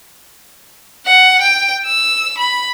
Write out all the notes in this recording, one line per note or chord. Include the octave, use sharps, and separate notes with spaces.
F#5
G5
E6
B5